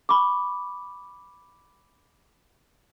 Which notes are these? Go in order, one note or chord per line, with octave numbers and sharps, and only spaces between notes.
B5 C#6 D6